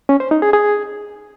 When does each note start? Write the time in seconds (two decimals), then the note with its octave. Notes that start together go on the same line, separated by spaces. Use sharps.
0.09 C#4
0.20 C5
0.31 D#4
0.42 G#4
0.53 G#4